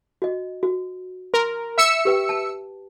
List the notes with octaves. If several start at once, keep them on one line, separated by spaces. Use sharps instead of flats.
F#4 D#5
F#4
A#4 C6
E5 B5 E6 C#7
G4 B4 G5
A5